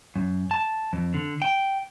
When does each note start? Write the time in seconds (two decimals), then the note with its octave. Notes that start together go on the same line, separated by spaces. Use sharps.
0.16 F#2
0.51 A5
0.93 F2
1.14 D3
1.42 G5